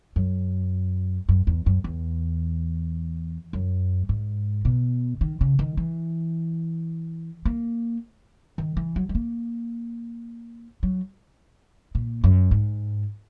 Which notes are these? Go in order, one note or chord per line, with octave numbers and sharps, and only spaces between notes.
F#2
F#2
E2
F#2
E2
F#2
G#2
B2
D#3
C#3
D#3
E3
A#3
D#3
E3
F#3
G#3
A#3
F#3
A#2
F#2
G#2